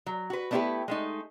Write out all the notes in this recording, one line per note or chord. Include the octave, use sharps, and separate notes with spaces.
F#3
F#4 B4
A3 B3 D4 E4 G4 B4
G#3 A3 D#4